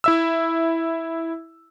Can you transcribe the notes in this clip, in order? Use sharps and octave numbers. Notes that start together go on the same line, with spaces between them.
E4 E5 E6